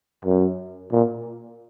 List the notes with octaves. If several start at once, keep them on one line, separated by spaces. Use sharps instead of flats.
F#2
A#2